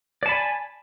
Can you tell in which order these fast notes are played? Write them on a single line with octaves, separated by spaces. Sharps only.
D5 A5 B5 G#5